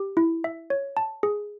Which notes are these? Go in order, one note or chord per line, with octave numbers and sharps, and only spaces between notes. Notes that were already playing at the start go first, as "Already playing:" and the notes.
Already playing: G4
E4
E5
C#5
A5
G#4